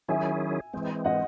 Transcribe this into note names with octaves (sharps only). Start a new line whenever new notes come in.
D#3 F#3 C#4 E4 G#4 E5 G#5
E3 G#3 C4
D#5 F#5